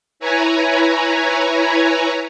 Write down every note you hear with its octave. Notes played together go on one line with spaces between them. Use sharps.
E4 B4 C#5 G#5 A#5